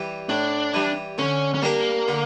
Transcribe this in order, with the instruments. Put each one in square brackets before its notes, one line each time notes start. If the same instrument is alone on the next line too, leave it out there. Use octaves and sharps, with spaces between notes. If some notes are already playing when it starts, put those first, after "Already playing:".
Already playing: [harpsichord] E3 G3
[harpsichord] A2 [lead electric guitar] D4
[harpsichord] E3 G3
[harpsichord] D3 [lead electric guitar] C#4
[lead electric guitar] C#4
[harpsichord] G3 D4 G4 A#4 [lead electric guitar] A#3
[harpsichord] D3